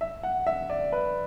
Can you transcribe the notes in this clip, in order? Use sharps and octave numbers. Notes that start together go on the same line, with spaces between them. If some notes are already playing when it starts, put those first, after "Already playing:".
E5
F#5
E5
D5
B4